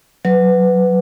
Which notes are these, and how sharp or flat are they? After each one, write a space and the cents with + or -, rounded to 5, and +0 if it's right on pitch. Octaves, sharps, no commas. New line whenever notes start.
F#3 +0 B4 +15